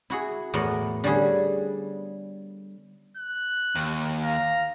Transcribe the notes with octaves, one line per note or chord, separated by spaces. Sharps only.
E4 F#4 G#4
E2 A2 E3 B3 A#4
D3 G3 C#4 G#4
F#6
D#2
F5 A#5